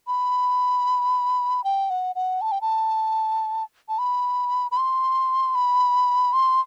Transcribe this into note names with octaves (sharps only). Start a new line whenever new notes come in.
B5
G5
F#5
F#5
A5
G5
A5
A5
B5
B5
C6
B5
C6